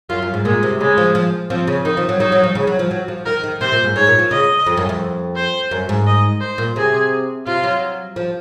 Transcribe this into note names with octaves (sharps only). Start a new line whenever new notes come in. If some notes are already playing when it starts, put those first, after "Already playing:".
F#2 F4
F#2
G#2
A#2 G#3
C3
C#3 G#3
F3
F3
F3 C4
C#3
D#3 D#4
F3
F#3
F#3 D#4
F#3
F3
C#3
F#3
F3
F#3
F3
D#3 A#4
D#3
C3 C5
A#2
G#2
G#2 C#5
A#2
F3
C#3 D#5
F2
F#2
F2
C5
F#2
G#2
D#5
C5
A#2
C3 G#4
C3 F4
F#3
F3